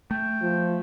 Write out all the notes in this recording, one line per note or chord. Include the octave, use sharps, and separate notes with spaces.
A3 G5
F3